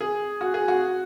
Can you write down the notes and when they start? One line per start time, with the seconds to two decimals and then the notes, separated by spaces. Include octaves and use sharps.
0.01 G#4
0.41 F#4
0.54 G#4
0.68 F#4